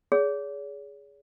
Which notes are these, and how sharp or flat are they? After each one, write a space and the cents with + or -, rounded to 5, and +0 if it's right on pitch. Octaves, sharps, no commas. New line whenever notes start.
G#4 +0 C#5 +45